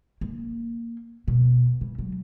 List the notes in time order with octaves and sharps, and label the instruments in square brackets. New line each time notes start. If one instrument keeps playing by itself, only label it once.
[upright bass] A#3
B2
C#3
F#3